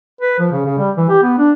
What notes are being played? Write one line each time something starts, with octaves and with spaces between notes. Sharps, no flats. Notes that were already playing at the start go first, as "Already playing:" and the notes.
B4
F3
C#3
C#3
G3
E3
G4
B3
D4